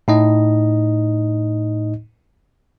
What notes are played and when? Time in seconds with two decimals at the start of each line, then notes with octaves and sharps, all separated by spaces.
0.08 A2 D#4 D#5